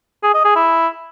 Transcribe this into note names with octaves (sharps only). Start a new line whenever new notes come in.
G#4
D#5
G#4
E4